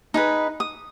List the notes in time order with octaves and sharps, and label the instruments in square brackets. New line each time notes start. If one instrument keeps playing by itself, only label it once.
[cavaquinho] D#4 G#4 B4
D#6